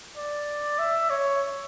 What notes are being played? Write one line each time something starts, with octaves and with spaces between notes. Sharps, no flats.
D5
E5
C#5